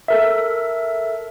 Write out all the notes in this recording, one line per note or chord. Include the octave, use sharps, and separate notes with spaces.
A4 A#4 E5